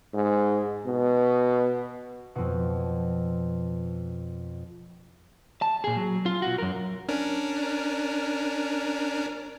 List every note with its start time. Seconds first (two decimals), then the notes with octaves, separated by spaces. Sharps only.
0.14 G#2
0.86 B2
2.35 F2 B2
5.62 A5
5.84 A#2 G#4
5.97 F#3
6.26 F4
6.42 B1 F#4
6.58 F#2 A#4
7.09 C#4 D4 A#4